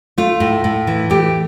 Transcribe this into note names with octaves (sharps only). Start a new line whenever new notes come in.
A3 F4
A2
A2
E3
A3 G4